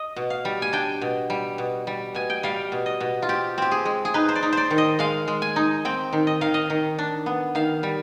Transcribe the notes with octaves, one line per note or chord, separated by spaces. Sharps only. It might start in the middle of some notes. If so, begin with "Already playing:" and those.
Already playing: D#5
B2
F5
G3
G#5
D4 G5
B2
G3
B2
G3
B2 G#5
G5
G3 F5
B2
D#5
B2
F4
C4 G4
C4 G4
G#4
G#3
G#4
D#4 B4
C5
D5
D#4
C5 D5
D#3
D#5
G#3 F5
G#3
G#5
D#4
C4 G5
D#3
D#5
D#3 F5
D#5
D#3
D4
B3
D#3 F5
G3